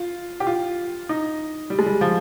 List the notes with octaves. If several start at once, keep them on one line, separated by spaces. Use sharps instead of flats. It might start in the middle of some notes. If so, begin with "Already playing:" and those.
Already playing: F4
G4
F4
D#4
G3
G#3
G3
F3